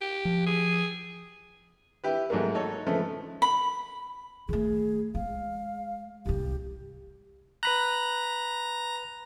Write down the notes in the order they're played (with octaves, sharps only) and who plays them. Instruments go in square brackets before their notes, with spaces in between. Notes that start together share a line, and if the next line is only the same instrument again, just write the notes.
[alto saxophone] G4
[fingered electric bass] F3
[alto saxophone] G#4
[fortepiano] E4 G4 B4
G#2 F#3 A3 A#3
D#4 A4 C#5
C#3 F3 A3 B3 A4
[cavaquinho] B5
[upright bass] D#3 A3 [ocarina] G#4
[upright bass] G#3 [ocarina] F5
[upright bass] C2 G3 [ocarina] G4
[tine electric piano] B4 B5 F#6 [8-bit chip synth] A#5